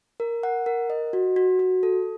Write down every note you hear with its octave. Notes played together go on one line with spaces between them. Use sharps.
A#4
F#5
A#4
D#5
F#4
F#4
F#4
A4